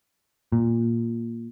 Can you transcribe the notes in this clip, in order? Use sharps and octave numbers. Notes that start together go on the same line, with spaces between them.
A#2